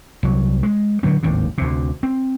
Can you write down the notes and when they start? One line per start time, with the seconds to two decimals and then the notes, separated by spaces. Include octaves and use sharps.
0.23 C2 F#3
0.63 G#3
1.03 B2 D3 F#3 C4
1.23 G#1 D#2 A2 C3
1.58 D2 C3
2.03 C4